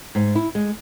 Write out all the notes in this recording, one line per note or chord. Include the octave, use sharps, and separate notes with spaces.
G#2
E4
G#3